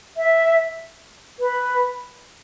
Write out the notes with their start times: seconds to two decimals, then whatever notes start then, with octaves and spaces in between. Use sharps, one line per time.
0.17 E5
1.40 B4